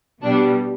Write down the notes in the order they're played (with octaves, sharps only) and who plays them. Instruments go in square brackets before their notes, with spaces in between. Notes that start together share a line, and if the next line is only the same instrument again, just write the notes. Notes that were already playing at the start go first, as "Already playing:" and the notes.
[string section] B2 G3 D4